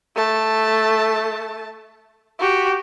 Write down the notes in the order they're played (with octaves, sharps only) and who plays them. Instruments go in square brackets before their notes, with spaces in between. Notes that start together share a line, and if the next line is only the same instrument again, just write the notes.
[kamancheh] A3 A5
F#4 G4